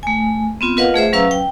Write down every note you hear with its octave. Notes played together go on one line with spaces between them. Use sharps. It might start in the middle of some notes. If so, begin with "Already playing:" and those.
A3 G#5
B3 C4 F4
F4 A#4 B4 D#5 F5 F#5
A3 G#4 C5 E5
F#3 C#4 B4 F5 A#5 E6
G5